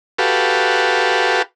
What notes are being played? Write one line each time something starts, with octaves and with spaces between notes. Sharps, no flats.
F#4 G4 A4 B4 F5